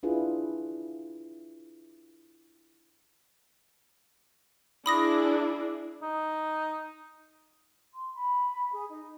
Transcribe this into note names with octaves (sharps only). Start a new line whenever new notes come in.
D4 E4 F4 G#4 B4
D4 E4 G#4 B5 D#6 A#6
D#4
C6
B5
G#4
D#4